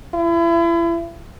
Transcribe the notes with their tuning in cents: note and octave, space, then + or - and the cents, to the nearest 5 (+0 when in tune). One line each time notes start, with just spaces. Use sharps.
E4 +35